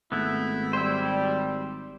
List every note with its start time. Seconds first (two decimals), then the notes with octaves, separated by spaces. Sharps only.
0.12 G#1 A3 B3 E4
0.73 G3 C5 E6